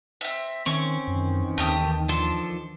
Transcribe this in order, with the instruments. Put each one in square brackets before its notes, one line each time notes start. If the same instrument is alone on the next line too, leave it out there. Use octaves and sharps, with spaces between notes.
[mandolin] C4 E5
[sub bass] D#3 [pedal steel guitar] C4 C#4 [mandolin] C#6
[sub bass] F#2 [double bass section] D#3 E3
[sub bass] D#2 [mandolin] A3 G4 D#6
[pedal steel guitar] F3 D4 A4 [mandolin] C6